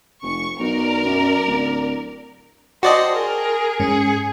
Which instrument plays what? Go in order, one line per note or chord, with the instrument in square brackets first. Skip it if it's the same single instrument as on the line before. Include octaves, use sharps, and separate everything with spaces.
[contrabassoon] F1 [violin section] C#6
[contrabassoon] B1 [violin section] A#4 D5
[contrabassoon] F#2
D1
[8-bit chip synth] F#4 D5 D#5 [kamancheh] C5 [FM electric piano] G5 A5
[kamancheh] G#4 A#4
[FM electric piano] G#2 C#4 C#7 [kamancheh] G#4